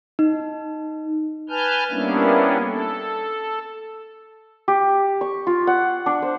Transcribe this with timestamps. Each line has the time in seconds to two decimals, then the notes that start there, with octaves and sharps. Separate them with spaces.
0.19 D#4
1.49 B4 G#5 A5 F6 G6
1.90 G3 A#3 B3 C#4 D4 E4
2.65 A4
4.68 G4
5.21 C#6
5.47 F4
5.67 F#5
6.06 D4
6.22 C5